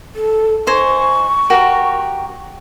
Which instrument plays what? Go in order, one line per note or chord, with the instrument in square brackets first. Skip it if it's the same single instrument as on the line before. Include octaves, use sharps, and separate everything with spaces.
[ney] A4
[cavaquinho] D#4 C5 G#5 [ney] C#6
[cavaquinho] F#4 G4 A#4